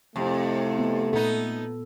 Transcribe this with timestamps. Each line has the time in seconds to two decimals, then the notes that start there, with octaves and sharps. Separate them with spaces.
0.16 F2 A2 C3 A3
0.78 B3
1.13 A#2 B3 D#4 A4